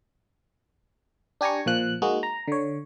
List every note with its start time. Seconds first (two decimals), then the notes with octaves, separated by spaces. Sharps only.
1.41 D4 G4 G#5 A#5 C#6
1.66 A#2 F3 F#6
2.02 G#3 A#3 D#4 F#4 G#4
2.23 A#5
2.48 D3 C#5